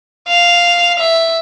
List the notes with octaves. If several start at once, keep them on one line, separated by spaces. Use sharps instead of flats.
F5
E5